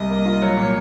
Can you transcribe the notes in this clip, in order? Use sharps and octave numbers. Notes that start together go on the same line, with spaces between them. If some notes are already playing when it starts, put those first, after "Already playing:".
Already playing: C2 D#5
A#3
F4
F#3 C#5
A#2